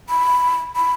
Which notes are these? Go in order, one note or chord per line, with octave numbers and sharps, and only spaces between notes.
B5
B5